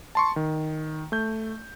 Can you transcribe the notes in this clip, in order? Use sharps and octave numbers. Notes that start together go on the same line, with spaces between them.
A5 C6 C#6
D#3
A3 G6